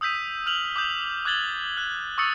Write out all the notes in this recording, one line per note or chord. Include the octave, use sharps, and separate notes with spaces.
D#6 E6 G6 B6 D#7
F6 F7 F#7
D6 D#6 G6
D6 F#6 G#6 A6 F#7 G7
F#6
C#6 D#6 E6 A6 C#7